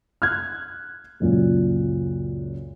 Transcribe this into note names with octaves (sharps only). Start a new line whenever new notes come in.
F6 F#6 G#6
C#2 F#2 A#2